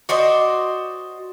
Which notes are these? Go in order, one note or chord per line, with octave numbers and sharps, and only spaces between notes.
F#4 C5 D5 D#5